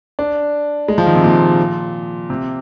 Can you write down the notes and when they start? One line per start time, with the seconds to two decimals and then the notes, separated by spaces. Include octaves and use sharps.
0.19 D4
0.88 G#3
0.98 F3
1.06 D#3
1.15 C3
1.23 A#2
2.30 C3